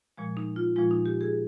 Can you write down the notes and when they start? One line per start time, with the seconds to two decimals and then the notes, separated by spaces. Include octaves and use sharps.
0.17 A#2 F3 G#3
0.37 D#4
0.56 F4
0.76 A#2 F3 G#3 F4
0.91 D#4
1.06 G4
1.21 G#4